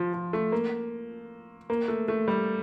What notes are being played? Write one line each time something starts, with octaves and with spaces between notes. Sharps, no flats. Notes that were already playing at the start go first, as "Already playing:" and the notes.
Already playing: F3
F3
A3
A#3
A#3
A3
A3
G3